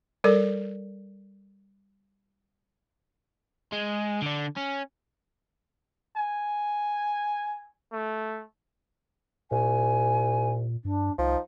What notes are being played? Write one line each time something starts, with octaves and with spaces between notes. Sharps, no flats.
G3 A4 A#4 D5
G#3
D3 D4
C#4
G#5
A3
C2 A#2 G#5
G2 D4
C2 F3 D#4